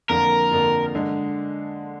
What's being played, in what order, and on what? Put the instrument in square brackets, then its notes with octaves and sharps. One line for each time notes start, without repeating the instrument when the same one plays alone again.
[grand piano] F2 D3 F3 A#3 F4 [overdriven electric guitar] A#4
[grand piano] F2 D3 F3 A#3 F4
D3 G#3